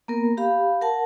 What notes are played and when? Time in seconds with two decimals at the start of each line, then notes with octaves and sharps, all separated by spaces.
0.08 A#3 B3 A#4
0.37 G4 F5 B5
0.82 A#4 F#5 A5